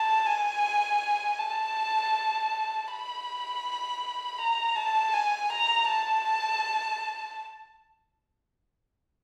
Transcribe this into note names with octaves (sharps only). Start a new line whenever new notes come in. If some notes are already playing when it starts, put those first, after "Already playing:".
Already playing: A5
G#5
A5
B5
A#5
A5
G#5
A#5
A5